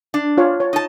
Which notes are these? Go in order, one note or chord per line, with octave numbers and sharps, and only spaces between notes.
D4
F4 C#5 F5
C#5
D#4 A5